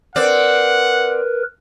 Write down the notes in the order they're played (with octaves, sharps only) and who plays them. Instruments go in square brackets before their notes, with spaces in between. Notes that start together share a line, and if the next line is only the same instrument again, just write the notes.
[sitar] C4 D5 [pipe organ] A#4 B4 [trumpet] F#5